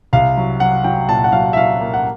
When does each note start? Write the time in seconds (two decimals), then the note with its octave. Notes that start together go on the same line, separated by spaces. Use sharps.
0.13 C2 F5
0.37 F#3
0.60 F#3 F#5
0.84 F#3 G5
1.09 A#2 A5
1.24 F#5
1.32 F#3 F5
1.53 E5
1.56 F#3 F5
1.81 A#3
1.94 F#5